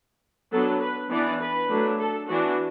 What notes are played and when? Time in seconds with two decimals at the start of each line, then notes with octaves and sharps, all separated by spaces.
0.51 F#3 B3 D4 A4
0.81 B4
1.10 E3 B3 D4 D5
1.40 B4
1.69 F#3 A3 D4
1.99 A4
2.29 E3 B3 D4 F#4